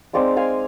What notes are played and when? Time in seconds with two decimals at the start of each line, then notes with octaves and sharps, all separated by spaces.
0.13 G#3 C4 D#4 D5 F5
0.37 F5 G#5